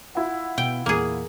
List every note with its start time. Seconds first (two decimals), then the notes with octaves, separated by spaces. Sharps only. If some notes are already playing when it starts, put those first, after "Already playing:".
0.15 E4 F4 F#5
0.58 B2 G5
0.86 E2 A#2 A#3 G#4